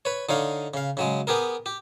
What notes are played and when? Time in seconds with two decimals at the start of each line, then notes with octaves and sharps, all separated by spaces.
0.05 B4 C#5
0.29 D3 D#4 C#5 F5
0.74 C#3 F5
0.97 C#3 F#3 G#3
1.27 B3 G4 G#4 A#4
1.66 G4